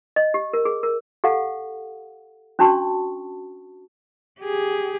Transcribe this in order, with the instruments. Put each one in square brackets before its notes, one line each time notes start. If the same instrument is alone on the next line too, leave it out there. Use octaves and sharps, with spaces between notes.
[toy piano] D#5
G4
A#4
G#4
A#4
G4 A4 F5 F#5
C#4 D4 F#4 A5 C#6
[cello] G4 G#4